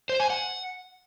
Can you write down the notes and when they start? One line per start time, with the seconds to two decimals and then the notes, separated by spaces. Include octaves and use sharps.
0.09 C5
0.20 G#5
0.30 F#5